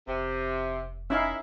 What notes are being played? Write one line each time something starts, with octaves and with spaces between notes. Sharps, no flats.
F1 C3
C#4 D#4 E4 F5